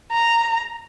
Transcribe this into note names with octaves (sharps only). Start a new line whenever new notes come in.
A#5